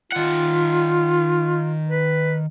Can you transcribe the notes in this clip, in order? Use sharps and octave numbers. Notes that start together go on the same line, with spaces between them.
D#3 F4 F#5
B4